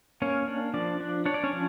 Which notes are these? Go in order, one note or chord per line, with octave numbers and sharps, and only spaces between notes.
A#3 C#4 C#5
D4
F3 D4 D5
D4
D4 C#5
D5
C#4 C#5
F3